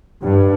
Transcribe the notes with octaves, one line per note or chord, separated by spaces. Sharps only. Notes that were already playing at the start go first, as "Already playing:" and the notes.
G2